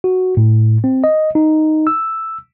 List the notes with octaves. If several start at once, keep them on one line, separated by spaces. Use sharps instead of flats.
F#4
A2
C4
D#5
D#4
E6